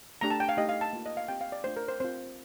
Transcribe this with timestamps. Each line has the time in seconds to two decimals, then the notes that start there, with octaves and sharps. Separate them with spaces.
0.21 A3 D4 G4 A#5
0.30 A5
0.40 G5
0.49 F5
0.57 A3 D#4 G4 D#5
0.69 F5
0.81 A5
0.93 A#3 F4
1.06 D#5
1.17 F5
1.28 C4 G4 G5
1.41 F5
1.52 D5
1.64 A3 D4 F4 C5
1.77 A#4
1.88 C5
2.00 C4 F4 C5